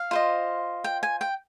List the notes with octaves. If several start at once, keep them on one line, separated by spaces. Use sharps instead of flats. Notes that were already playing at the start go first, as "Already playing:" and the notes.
Already playing: F5
F4 C5 D#5
G5
G#5
G5